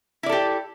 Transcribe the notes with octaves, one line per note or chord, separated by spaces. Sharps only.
E4 G4 A4 D5